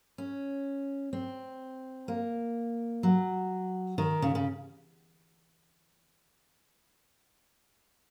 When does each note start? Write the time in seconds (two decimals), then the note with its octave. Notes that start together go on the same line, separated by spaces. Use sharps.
0.18 C#4
1.13 C4
2.08 A#3
3.03 F#3
3.98 D#3
4.22 C#3
4.35 C#3